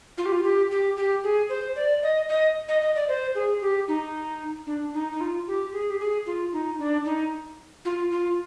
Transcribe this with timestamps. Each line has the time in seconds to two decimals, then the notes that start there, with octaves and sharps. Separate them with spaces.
0.18 F4
0.26 G4
0.32 F4
0.44 G4
0.71 G4
0.97 G4
1.24 G#4
1.49 C5
1.76 D5
2.03 D#5
2.29 D#5
2.69 D#5
2.82 D#5
2.95 D5
3.08 C5
3.35 G#4
3.61 G4
3.88 D#4
4.67 D4
4.94 D#4
5.12 D#4
5.21 F4
5.47 G4
5.73 G#4
5.90 G4
5.99 G#4
6.26 F4
6.53 D#4
6.79 D4
7.06 D#4
7.85 F4
8.11 F4